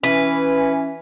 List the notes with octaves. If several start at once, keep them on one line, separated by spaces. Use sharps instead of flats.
E3 C#4 B4